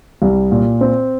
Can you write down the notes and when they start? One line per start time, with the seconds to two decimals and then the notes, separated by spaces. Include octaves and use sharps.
0.22 C2
0.52 A#2
0.81 C4